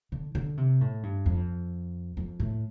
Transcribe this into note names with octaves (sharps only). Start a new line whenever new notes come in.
D3
D3
C3
A2
G2
F2
F2
A2